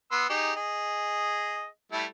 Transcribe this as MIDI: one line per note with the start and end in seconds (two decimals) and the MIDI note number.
0.11 0.29 59
0.11 0.29 84
0.11 0.29 88
0.30 0.52 63
0.30 0.52 67
0.30 0.52 68
0.56 1.66 68
0.56 1.66 75
1.92 2.05 55
1.92 2.05 57
1.92 2.05 64